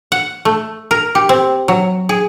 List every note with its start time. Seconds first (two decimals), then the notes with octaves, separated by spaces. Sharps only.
0.12 F#5
0.45 A3
0.91 A#4
1.15 G4
1.29 C4
1.68 F#3
2.09 G#4